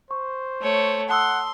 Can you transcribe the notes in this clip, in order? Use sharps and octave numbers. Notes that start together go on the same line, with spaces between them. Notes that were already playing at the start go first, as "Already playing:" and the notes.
C5 C#6
A3 C#5
F#5 A5 C6 D#6 E6